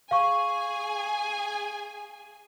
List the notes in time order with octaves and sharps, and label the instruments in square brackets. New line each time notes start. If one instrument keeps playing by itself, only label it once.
[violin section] G#4 G#5 [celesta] F5 C#6